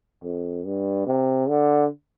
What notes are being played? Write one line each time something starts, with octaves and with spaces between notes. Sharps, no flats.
F2
G2
C3
D3